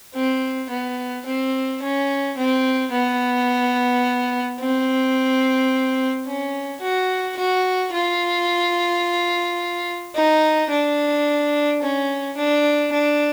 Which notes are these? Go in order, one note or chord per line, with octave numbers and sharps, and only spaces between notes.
C4
B3
C4
C#4
C4
B3
C4
C#4
F#4
F#4
F4
D#4
D4
C#4
D4
D4